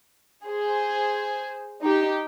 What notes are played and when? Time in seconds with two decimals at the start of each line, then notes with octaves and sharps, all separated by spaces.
0.45 G#4 C5
1.83 D#4 G4